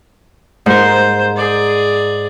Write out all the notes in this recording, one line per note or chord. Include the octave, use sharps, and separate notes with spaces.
G#2 A#4 C5
G#4 D5